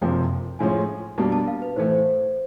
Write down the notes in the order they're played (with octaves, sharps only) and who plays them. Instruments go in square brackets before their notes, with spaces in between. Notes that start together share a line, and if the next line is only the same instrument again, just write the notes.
[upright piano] F#1 F2 C3 F3 A#3 [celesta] G5
[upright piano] A2 F3 G#3 C#4 [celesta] G#5
[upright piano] B2 G3 A#3 D4 [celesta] A5
[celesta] A5
F5
B4
[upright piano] A2 E3 A3 [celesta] C5
[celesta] C5